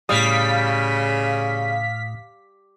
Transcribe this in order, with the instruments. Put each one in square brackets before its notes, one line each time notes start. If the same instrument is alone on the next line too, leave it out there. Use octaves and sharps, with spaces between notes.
[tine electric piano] A2 D#6 [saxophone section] C#3 [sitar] G3 [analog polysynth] F5 B6